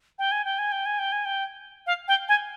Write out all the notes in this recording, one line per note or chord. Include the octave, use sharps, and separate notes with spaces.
G5
G#5
G5
G#5
G5
G#5
G5
G#5
G5
F5
G5
G#5